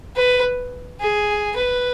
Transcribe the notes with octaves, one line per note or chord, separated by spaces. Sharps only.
B4
G#4
B4